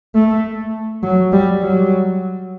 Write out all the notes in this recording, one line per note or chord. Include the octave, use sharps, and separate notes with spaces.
A3
F#3
G3
F#3